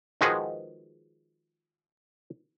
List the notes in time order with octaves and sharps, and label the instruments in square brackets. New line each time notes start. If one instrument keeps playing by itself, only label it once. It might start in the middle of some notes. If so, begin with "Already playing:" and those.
[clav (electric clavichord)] D#3 F3 G#3 F#4 G#4 B4